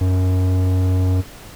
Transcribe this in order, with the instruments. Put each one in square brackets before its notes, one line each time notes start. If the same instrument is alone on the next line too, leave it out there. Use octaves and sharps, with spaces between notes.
[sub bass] F#2